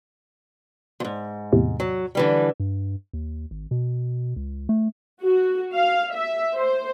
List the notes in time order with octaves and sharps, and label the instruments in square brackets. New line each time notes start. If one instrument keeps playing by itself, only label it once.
[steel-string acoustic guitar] F2 G#2
[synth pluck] E2 A2 C3
[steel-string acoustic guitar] F#3
D3 E3 G3
[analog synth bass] G2
D#2
G#1
B2
C#2
A3
[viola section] F#4
F5
E5
C5